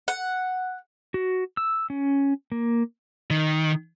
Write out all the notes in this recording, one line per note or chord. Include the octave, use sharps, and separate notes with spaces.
F#5
F#4
E6
C#4
A#3
D#3